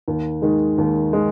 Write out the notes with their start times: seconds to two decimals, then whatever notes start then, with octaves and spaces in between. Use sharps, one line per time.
0.08 D#2
0.42 D#3 G#3
0.78 D#2
1.13 D#3 G#3